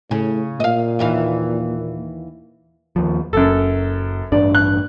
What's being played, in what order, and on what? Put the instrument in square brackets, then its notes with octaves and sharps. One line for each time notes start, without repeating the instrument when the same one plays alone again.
[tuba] A2 [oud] C#3
[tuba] A#2 [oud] D#5 F5
[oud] D#2 E3 F5
[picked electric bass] D#2 F3
[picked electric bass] F#1 [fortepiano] F#2 A4
[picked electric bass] A1 G2 D4 [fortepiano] D5
[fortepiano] F#6